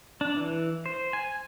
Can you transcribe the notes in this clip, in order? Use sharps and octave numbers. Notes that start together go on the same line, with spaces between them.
D4
E3
C5
G#5